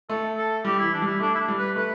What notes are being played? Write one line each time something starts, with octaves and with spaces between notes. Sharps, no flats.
A3 A4
A4
G3 G4
E3 E4
D4
G3 E4
A3 D4
E4
D4
G3
B4
A3 B4